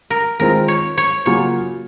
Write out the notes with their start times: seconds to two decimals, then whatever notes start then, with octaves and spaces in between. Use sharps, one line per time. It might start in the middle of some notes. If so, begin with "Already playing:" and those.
0.10 A#4
0.39 D#3 G#3 C4 F4 A#4
0.68 C#5
0.98 C#5
1.26 C#3 F#3 A#3 F4 C#5